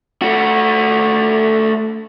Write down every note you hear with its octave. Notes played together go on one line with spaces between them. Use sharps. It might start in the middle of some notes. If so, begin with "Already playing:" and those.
A3 F#4